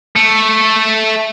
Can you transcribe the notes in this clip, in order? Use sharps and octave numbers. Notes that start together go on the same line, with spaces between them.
A3